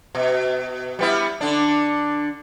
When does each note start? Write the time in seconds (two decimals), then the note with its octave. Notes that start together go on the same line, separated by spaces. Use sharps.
0.15 B2
0.99 G3 B3 E4
1.41 D3 D4